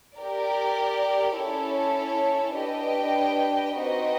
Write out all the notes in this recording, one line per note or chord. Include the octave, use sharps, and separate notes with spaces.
G4 A#4 D5
C#4 E4 A4 C#5
D4 G4 B4 D#5 G5
C4 D#4 F#4 B4 D#5